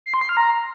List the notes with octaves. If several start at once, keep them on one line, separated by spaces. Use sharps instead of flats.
C7
C6
C7
F6
A#5